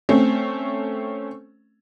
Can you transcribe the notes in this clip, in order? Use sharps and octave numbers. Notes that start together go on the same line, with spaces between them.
A3 C4 C#4